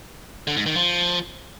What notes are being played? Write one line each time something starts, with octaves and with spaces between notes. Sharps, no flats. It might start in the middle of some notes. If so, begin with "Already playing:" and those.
D3
G#2
D#3
F3